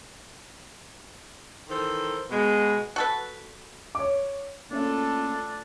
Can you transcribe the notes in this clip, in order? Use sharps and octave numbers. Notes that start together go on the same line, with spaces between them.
D#3 E3 A4 A#4 C5
B2 G#3
F#4 A4 B4
C#5 D6
A3 A#3 C#4 D4 F4 A4 E5